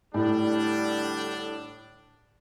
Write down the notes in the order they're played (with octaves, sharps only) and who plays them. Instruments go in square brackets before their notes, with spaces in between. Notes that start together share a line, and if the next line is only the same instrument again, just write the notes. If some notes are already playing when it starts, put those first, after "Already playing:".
[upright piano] A2 [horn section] D3 G3 D4